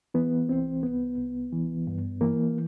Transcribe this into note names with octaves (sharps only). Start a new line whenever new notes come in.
E3 B3
C2 C4
C2 B3
C2
E3
G2
E3 A#3